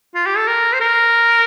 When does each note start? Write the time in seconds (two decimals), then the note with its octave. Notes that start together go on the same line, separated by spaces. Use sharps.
0.14 F4
0.26 G4
0.37 A4
0.47 A#4
0.73 C5
0.80 A#4